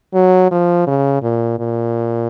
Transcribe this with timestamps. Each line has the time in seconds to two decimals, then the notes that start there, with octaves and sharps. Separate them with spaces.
0.14 F#3
0.51 F3
0.87 C#3
1.22 A#2
1.59 A#2